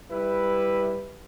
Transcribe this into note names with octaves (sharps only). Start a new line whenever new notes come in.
G3 E4 B4